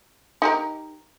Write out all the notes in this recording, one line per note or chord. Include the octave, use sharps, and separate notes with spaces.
D#4 G4 A#4